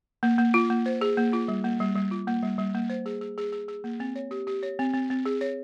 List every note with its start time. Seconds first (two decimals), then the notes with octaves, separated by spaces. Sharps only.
0.23 A#3
0.38 A#3
0.54 F4
0.70 A#3
0.86 C5
1.01 G#4
1.17 A#3
1.33 F4
1.48 G3
1.64 A#3
1.80 G3
1.95 G3
2.11 F4
2.27 A#3
2.43 G3
2.58 G3
2.75 A#3
2.90 C5
3.06 G#4
3.21 G#4
3.38 G#4
3.53 G#4
3.68 G#4
3.84 A#3
4.00 C4
4.16 C#5
4.31 G4
4.47 G4
4.63 C#5
4.79 C4
4.94 C4
5.10 C4
5.26 G#4
5.41 C#5